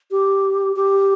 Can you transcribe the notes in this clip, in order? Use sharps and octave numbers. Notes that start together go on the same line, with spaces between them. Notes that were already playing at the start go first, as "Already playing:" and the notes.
G4
G4